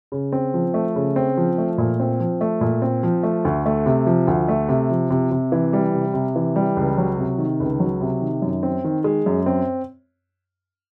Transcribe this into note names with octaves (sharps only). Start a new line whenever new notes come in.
C#3
C4
F3
A3
C#3
C4
F3
A3
A#2
C4
F3
A3
A#2
C4
F3
A3
D2
A3
C3
F3
D2
A3
C3
F3
C3
C3
E3
G3
C3
C3
E3
G3
C#2
F#3
C3
D#3
C#2
F#3
C3
D#3
F#2
C4
D#3
G#3
F#2
C4